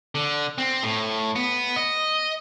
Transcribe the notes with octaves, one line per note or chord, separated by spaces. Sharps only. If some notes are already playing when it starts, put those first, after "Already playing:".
D3
C4
A2
B3
D#5